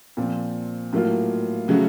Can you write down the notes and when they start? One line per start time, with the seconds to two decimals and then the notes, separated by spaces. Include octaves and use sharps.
0.17 A#2 F3 C4
0.93 A2 F#3 A#3 F4
1.68 C#3 F#3 A3 C#4 F#4